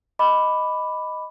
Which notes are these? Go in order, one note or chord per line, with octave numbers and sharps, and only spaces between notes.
D#5 B5 D6